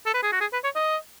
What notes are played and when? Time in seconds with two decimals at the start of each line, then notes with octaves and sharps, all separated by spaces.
0.06 A4
0.14 B4
0.23 G#4
0.32 F#4
0.41 G#4
0.53 B4
0.64 C#5
0.75 D#5